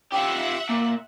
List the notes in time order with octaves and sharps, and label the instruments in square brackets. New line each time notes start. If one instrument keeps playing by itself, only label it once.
[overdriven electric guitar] F4 G4 [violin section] E5 F#5
[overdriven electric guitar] A#2